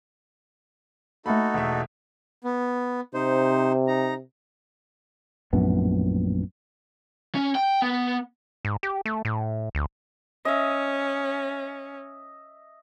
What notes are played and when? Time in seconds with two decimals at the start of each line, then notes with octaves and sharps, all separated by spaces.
1.26 A3 A#3 D#4 F#4 A4 B5
1.54 E1 E5
2.44 B3
3.14 C3 D#4 C5
3.87 D#4 A#5
5.53 A#1 F#2 A2 B3
7.35 C#4
7.55 G5
7.82 B3
8.65 G#2
8.83 G4
9.05 A3
9.25 A2
9.75 D2
10.45 C#4 D#5 E5